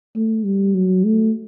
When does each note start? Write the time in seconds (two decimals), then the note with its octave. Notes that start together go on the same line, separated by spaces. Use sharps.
0.16 A3
0.45 G3
0.75 F#3
1.04 A3